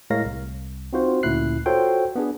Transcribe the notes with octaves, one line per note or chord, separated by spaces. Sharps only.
A2 G#3 A#4 C#5 F5 A#6
C2
C4 D#4 F4 F#4 C5
D2 A#2 C#4 E4 F#6 C7
F4 F#4 A4 C5 C#5 G5
B3 D4 G#4